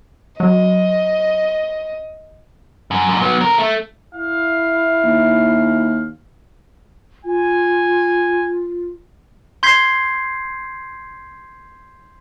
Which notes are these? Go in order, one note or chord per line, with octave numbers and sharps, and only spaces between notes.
F#3 D#5
F#2
F#2 A#2
F#3 B3
D3 A#4
A3
E4 F5
D#2
F4 G#5
C6 G6 G#6 B6 C7